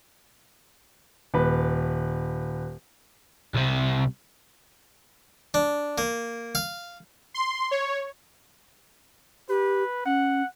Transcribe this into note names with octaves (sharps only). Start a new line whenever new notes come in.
D#1 B4
C2 C3
D4
A#3
F5
C6
C#5
G4 B4
C#4 F#5